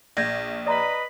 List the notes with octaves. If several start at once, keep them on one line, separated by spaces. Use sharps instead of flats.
A#1 G6 G#6 A#6
B4 D5 D#5 A#5 B5